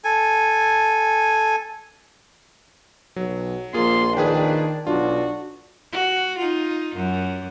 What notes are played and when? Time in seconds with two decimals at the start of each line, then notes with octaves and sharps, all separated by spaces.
0.04 A4 G#5
3.16 B1 F#3
3.74 A#1 A#3 F4 G#4 C6
4.17 D#3 D4 G#4 B4 G5
4.87 B1 D4 F4 F#4
5.92 F#4
6.38 D#4 F4
6.96 F#2